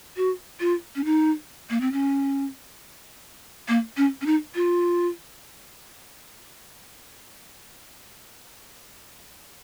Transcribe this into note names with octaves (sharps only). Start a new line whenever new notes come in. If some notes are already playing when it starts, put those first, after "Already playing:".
F#4
F4
C#4
D#4
A#3
C4
C#4
A#3
C#4
C#4
D#4
F4